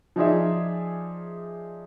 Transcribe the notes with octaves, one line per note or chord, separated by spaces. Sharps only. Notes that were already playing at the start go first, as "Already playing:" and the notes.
F3 D#4 F4 G#4 D5 E5